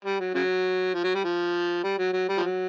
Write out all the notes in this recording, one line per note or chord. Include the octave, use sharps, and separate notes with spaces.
G3
F#3
C#3 F#3
F3
F#3
G3
F3
G3
F#3
F#3
G3
F3
F#3